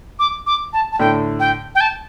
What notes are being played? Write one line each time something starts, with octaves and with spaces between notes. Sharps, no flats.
D6
D6
A5
A5
A2 D3 G5
G5
G5
A5